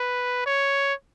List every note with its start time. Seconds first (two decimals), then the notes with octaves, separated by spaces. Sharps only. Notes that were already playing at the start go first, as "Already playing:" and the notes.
Already playing: B4
0.46 C#5